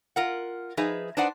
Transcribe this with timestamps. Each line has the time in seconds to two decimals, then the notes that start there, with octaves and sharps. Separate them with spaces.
0.16 F4 A#4 F#5
0.77 F3 D#4 G#4 B4 E5
1.17 D4 D#4 B4 C5 D5 F#5